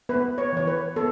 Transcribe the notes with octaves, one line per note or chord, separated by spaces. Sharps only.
B3 B4
C#5
E3 C#5
B4
B3 A4